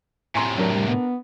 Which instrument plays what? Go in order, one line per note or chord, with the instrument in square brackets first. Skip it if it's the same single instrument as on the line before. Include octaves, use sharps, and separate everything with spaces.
[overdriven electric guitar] A2 C3 [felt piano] G#5 A#5 C6
[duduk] F#3 [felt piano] D4 A#4
[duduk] G3
B3